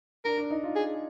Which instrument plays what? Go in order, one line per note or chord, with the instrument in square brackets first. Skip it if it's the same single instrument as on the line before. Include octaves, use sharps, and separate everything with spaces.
[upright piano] D4 [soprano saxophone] A#4
[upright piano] D4
D#4
F4
[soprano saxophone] G#4